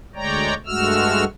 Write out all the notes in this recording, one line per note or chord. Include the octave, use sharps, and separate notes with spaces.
D2 G#3 C#5 D5 G5 A#5
G2 G#3 A3 F#4 E6 F6